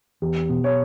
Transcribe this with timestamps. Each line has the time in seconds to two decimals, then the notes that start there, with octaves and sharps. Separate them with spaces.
0.22 E2 G4
0.49 B2
0.64 C#5